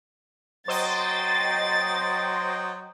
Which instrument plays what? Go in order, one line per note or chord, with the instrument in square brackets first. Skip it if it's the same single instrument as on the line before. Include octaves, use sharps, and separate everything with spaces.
[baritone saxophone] F#3 [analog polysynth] C5 D#5 G5 [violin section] A6